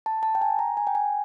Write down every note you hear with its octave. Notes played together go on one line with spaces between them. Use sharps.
A5
A5
G5
G#5
A#5
G#5
G5
G#5